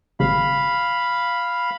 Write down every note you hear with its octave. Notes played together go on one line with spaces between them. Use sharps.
G#1 C#3 F5 B5